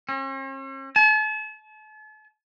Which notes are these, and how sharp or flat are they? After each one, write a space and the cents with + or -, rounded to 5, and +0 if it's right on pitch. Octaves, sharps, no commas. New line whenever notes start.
C#4 -45
A5 -40